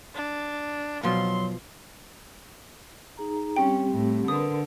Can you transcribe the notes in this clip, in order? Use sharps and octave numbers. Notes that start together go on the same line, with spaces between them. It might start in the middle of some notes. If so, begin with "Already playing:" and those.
D4
B2 F3 F#3 F4 C6
D#4 G#4 A#5
G3 C4 C#4 G4 G5
A2
D3 A#4 B4 D#6